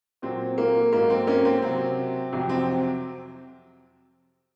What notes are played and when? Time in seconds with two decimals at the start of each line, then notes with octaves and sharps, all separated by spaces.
0.22 A#2 F#3 C4
0.58 A#3
0.92 G#2 F#3 A#3
1.10 C4
1.27 A#3 C#4
1.45 C4
1.62 C3 F#3 C4
2.32 F2 C3 F#3
2.49 C4